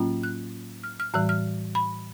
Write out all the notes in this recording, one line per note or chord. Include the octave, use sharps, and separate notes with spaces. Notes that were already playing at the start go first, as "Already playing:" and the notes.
Already playing: A2 F#3 A#3 C#4 F4
F#6
F6
F6
A2 E3 G3 F#6
F6
B5